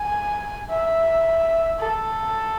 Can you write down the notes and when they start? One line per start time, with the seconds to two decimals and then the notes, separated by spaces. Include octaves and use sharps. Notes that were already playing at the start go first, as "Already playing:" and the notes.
Already playing: G#5
0.69 E5
1.79 A4